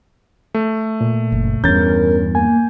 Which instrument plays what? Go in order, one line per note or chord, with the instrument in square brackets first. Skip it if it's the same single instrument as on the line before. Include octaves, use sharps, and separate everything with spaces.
[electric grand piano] A3
[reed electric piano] A#2
[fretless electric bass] F#1
[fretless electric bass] E2 G2 [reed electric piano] C#4 [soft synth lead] A#4 [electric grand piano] G6 A6
[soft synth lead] A#3 [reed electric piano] G#5